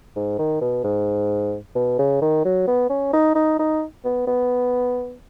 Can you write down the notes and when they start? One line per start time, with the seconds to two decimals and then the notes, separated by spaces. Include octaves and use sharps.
0.16 G#2
0.39 D#3
0.61 B2
0.84 G#2
1.75 B2
1.99 C#3
2.22 D#3
2.45 F#3
2.67 B3
2.90 C#4
3.13 D#4
3.35 D#4
3.59 D#4
4.05 B3
4.27 B3